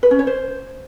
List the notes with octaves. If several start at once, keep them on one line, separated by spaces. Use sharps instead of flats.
B4
C#4
C#5
C5